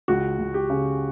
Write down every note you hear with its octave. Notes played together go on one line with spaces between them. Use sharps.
C#2 F#4
C#2
G4
C#3